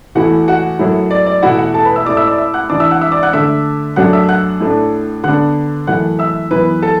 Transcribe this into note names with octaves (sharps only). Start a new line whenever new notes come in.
E2 E3 A3 E4 F#4 F#5
F#4 F#5
F#2 F#3 A3 E4
D5
D5
E2 B2 A3 E4 F#4 F#5
F#4 F#5
A4 A5
B4 B5
E5 E6
A2 A3 E4 D5 D6
E5 E6
D5 D6
E5 E6
F#5 F#6
E2 E3 D4 D5 D6
E5 E6
F#5 F#6
E5 E6
D5 D6
F#5 F#6
D3 A3 D4 E5 E6
F#2 F#3 A3 D4 F#5 F#6
E5 E6
F#5 F#6
A2 A3 D4
D3 B3 D4 F#5 F#6
F#2 E3 A3 F#5 F#6
E5 E6
F#2 E3 B3 E4 B4 B5
A4 A5